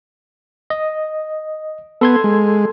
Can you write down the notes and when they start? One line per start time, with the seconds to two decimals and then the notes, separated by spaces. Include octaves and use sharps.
0.70 D#5
2.01 B3 A4 C6 G#6
2.24 G#3